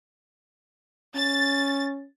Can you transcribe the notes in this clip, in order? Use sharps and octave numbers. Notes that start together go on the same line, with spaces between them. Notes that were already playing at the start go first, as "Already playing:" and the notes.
C#4 A6